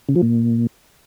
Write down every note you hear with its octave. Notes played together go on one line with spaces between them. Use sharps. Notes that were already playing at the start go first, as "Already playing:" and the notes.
C#3
F3
A#2